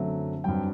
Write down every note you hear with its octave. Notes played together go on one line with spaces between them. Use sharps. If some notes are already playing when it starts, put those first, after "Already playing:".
Already playing: F#2 D3 F#3 A3 C4 E5
G2 F#3 C4 G5